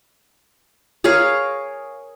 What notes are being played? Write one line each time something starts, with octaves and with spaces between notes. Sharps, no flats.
G#4 A#4 C#5 F5